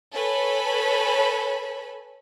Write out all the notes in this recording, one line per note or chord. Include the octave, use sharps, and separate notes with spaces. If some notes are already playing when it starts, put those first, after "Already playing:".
A4 B4 C#5 G#5 B5